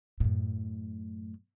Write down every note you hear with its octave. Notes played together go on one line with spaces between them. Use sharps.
F#2 A2